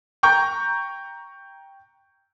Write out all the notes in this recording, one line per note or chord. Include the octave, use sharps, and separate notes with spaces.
G5 A#5 C#6 G6